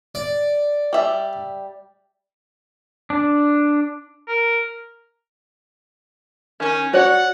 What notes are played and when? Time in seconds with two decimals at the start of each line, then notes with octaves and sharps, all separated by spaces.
0.15 D5
0.93 G3 E5
3.10 D4
4.28 A#4
6.60 D#3 C#4
6.93 F#4 C#5 D5 F#5